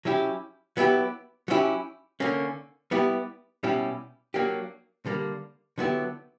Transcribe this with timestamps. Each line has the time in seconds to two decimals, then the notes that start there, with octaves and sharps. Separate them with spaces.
0.05 F#3 C#4 E4 G4
0.77 F#3 B3 E4 G4
1.48 F#3 C#4 E4 G4
2.20 D3 A#3 C#4
2.91 G3 B3 E4 G4
3.63 B2 G3 C#4 E4 G4
4.34 F#3 A#3 D4 G4
5.06 D3 G3 A#3
5.78 D3 F#3 B3 E4 G4